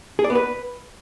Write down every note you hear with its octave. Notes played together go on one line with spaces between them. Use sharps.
G#4
D5
B3
B4